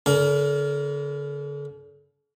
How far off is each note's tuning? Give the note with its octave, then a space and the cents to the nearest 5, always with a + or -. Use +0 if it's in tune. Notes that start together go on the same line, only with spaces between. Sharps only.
D3 -45 D4 -45 A#4 +0